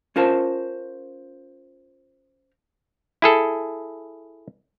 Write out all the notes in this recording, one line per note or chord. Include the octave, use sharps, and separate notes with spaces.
C#4 F4 A#4 C5 A5
E4 G#4 A4